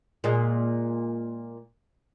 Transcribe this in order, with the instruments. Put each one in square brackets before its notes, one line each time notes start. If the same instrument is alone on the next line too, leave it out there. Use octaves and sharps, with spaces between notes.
[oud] A#2 G#3